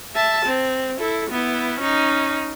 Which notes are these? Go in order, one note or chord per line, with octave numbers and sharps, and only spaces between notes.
E5 A5
C4
E4 A4
B3 E4
C#4 D#4